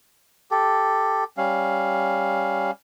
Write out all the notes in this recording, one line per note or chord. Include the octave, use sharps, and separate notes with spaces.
G4 A4
G3 C#4 F5